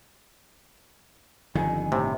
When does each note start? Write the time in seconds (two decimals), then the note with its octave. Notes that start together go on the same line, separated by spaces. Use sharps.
1.55 G1 F2 D3 D#3 G#5
1.92 A2 C3